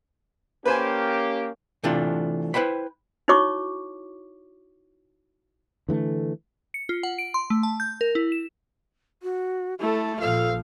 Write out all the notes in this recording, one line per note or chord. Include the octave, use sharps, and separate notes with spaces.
A#3 C#4 G4 B4 C5 G#5
C3 E3 A3 D4 F4
E4 B4 C5 G5 B5
D#4 E4 F#4 C#5 C#6 D6
D3 E3 A3
C#7
F4
F#5
D7
C6
A3
A5
G6
A#4
E4
E7
F#4
A3 E4 A4
A#1 F3 A4 F5